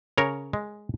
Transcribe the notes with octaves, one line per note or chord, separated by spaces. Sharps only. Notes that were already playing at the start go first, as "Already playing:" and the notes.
C#3 A#4 C#5
G#3